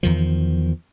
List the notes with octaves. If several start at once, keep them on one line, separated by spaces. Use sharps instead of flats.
E2 D#3 F3